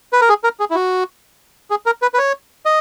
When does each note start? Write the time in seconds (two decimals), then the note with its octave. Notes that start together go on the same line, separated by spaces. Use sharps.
0.13 B4
0.21 A#4
0.29 G#4
0.44 A#4
0.60 G#4
0.71 E4
0.75 F#4
1.70 G#4
1.86 A#4
2.02 B4
2.14 B4
2.18 C#5
2.66 D#5